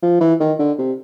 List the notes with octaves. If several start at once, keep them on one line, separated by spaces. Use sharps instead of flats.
F3
E3
D#3
D3
C3